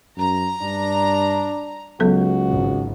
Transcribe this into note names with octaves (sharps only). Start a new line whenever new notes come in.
F#2 A#5
G2 D4
C#2 F#3 B3 F#4 A4
G#1